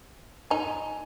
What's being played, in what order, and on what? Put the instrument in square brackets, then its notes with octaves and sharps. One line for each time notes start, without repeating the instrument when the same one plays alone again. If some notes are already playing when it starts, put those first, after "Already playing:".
[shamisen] D#4 [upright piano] G#5